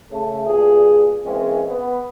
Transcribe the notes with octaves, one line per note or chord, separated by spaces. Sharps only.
C#3 A3
G2 A#2 G#4
E3 G#3 A#3 C4 C#4
B3